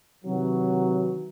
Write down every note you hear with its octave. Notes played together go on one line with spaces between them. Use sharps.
C3 D#3 E3 F#3